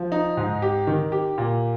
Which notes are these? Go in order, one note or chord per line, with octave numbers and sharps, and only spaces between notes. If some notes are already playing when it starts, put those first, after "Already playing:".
Already playing: F3
D#4
G#2
G4
D#3
G4
A#2